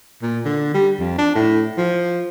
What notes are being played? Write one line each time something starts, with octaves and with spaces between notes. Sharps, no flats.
A#2
D3
G3
F2
D4
A2
F3